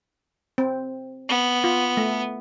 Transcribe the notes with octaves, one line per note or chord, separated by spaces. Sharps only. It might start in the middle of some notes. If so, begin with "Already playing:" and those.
C4
B3
F4
A3